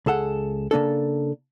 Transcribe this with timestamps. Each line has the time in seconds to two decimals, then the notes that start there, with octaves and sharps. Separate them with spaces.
0.06 C#2 G#4 A4 F#5
0.71 C#3 A#3 D4 A4